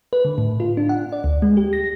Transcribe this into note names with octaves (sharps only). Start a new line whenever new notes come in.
B4
D3
A2
F4
D4
F#5
D5
D2
G#3
G4
A#6